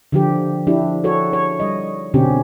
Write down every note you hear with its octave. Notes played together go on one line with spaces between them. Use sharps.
D3 F3 G4
F3 D4 E4 G4
F#4 A4 C#5
C#5
G3 D#5
B2 D3 C4 C#4 G4